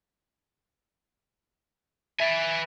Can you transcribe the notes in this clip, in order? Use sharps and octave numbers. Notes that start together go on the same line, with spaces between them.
B4 E5 G#5 A6 D7